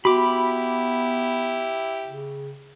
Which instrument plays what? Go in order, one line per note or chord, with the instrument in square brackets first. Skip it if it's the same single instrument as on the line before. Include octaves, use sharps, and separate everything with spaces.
[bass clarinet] B3 [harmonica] E4 G4 [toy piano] F#4 [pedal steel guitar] B5 D6
[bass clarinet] C#3